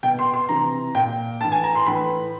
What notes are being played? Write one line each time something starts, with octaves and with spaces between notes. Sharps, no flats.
B2 G5
C6
C6
C3 E3 A#5
A#2 G5
A2 E3 A5
G#5
A#5
C6
A2 E3 B5